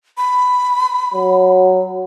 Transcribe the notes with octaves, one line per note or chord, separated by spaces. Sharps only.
B5
F#3